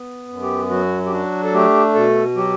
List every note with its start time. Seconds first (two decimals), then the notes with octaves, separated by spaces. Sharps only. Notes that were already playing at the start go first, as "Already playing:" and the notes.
Already playing: B3
0.29 F#2
0.42 G4
0.70 F#3 F#4
1.06 G4
1.12 D4 F#4
1.44 A4
1.53 A3 G4
1.95 B2 A4
2.36 F#3 G4